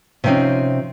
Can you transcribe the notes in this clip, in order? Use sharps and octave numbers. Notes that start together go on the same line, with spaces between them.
C3 F3 C4 C#4 D#4